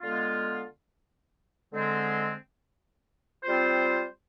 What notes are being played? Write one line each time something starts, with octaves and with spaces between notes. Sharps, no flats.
D3 G#3 B3 F4
D3 G#3 C4
G3 C4 F4 C5